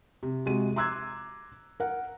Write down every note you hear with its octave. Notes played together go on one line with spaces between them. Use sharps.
C3
C3 G#3 F#4 D#7
A#5 C6 D6 E6 F#6 G#6
A#4 F#5